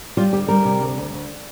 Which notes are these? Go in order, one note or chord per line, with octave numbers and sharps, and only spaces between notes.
G3 F4
D2 G4
G3 A#4
C3
D2
D2
D2